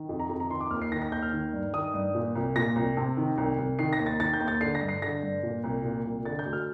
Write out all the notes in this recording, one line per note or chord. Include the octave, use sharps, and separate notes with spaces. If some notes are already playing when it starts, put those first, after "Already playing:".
Already playing: D#3
F2
A#5
F2
A#5
D#3 C6
D6
D#2 F6
C7
D#3 A#6
A#6
D#2 G6
F6
D#3
G2
D#3 D#6
G2
A#2
C2
A#2 A#6
C2
C3
D#3
C2
C2
D#3 C7
A#6
D#2
A6
D#3 A6
G6
D#2
A6
D3 C7
A#6
G2
C7
D3 A#6
G2
A#2
C2
A#2
C2
D3 A6
G6
D2
F6